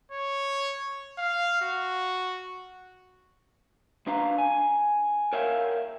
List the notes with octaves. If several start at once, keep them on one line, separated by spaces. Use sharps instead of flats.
C#5
F5
F#4
C2 D4 B4 F5 A#5
G#5
A#4 C#5 E5 F5 G5